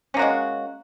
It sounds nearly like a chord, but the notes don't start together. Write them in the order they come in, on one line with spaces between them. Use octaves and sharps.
C#4 A#3 F#4 G#3